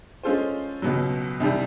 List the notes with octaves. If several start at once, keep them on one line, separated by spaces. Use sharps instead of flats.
G#3 C#4 F4 A4 C5
C#2 B2 F#3
C2 C3 D#3 G3